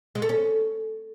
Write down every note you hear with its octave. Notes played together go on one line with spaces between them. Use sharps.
G#3
A4
C#4